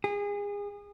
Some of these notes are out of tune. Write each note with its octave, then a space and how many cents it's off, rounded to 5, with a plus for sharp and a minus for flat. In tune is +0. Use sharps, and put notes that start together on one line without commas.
G#4 -30